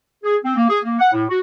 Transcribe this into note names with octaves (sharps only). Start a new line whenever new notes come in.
G#4
C4
A#3
G#4
A#3
F#5
A2
F#4